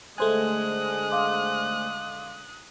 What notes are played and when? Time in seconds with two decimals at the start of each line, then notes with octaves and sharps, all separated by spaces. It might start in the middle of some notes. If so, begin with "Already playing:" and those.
0.18 D3 G#3 A3 C5 G#5 D#6 F#6
1.11 F5 C6 D6